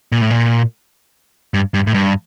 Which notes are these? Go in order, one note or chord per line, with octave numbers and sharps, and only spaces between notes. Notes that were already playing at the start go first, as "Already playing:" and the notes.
A#2
A2
A#2
G2
G2
A2
G2